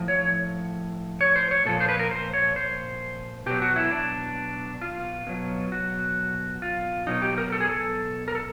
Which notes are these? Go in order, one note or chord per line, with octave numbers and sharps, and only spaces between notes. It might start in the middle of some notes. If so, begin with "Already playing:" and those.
Already playing: A2 F3
C#5
C#5
C5
C#5
A#2 F3 A4
C5
B4
A#4
C5
C#5
C5
B2 F#3 G4
F#4
E4
D4
F4
B2 F#3
F#4
F4
B2 F#3 D#4
G4
A#4
A4
G#4
A4
A#4
A4